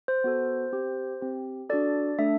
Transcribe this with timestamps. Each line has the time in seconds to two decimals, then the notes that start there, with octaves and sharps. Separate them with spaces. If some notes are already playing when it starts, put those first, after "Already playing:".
0.08 C5
0.24 B3 F#4 A4
0.72 C4 G4
1.21 C4 G4
1.70 D4 F#4 A4 D5
2.19 A3 D4 A4 E5